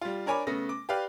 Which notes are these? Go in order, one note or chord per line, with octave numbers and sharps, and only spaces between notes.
G3 F4
D4 A#4 C#5 G#5 B5 D6
C#3 A3 B3 A#6
D6
G4 B4 D5 F5